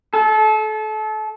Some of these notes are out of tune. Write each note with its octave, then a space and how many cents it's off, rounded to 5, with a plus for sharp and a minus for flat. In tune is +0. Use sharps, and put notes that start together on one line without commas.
A4 -30